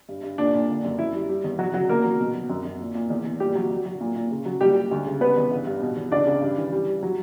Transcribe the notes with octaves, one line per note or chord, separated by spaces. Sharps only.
G2
G2
A#2 D4
A#2
D3
F#2
F#2 E4
G3
G3
E2
F#3 F#4
C#3 F#3 F#4
E2 A#3 A#4
F#3
B2
F#3
F#2
F#2
A#2
A#2
E2
E2
A#2 G3 G4
F#3
F#3
F#3
A#2
A#2
C#3
F#3
A#2 G3 G4
G3
D2
C#3
G3 B3 B4
E2
G2
G2
B2
E2
C#2 D4 D5
C#3
G2
E3
G3
G3
F#3